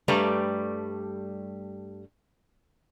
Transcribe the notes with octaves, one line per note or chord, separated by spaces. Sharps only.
G2 G3 A3 B4 D5 A#5